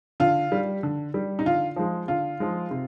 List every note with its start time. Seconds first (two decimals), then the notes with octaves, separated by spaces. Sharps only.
0.20 D3 F4
0.52 G3
0.83 D3
1.14 G3
1.39 D#4
1.45 D3 F4
1.76 F3 G#3
2.08 D3 F4
2.40 F3 G#3
2.71 C3